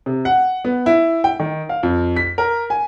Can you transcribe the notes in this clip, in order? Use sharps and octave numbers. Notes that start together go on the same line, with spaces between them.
C3
F#5
B3
E4
G5
D#3
F5
F2
B6
A#4
G#5